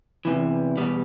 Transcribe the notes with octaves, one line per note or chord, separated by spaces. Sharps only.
E2 C3 E3
E2 B2 G3